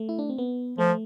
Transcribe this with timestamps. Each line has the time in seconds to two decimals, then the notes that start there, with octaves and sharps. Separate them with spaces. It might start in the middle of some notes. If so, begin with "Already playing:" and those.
Already playing: A3
0.09 E4
0.19 D4
0.29 C4
0.38 B3
0.78 F3 A3